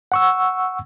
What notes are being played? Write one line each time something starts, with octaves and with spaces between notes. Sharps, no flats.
F#5 C#6 E6